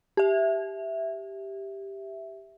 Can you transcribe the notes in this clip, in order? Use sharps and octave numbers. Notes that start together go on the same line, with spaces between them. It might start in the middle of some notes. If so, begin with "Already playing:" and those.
G4 E5